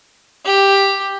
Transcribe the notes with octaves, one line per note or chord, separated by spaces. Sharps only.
G4